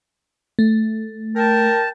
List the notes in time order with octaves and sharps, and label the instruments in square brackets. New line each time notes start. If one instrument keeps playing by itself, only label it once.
[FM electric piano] A3
[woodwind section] A#4 G5 A5